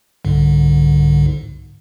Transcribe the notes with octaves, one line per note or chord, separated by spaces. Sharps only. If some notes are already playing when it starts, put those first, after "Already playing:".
C2 G#2 D3